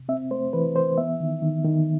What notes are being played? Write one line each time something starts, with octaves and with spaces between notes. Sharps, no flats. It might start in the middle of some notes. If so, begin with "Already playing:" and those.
Already playing: C3
C4 E5
A3 C5
E3 B4
E3 C5
B3 E5
D#3
D#3
D#3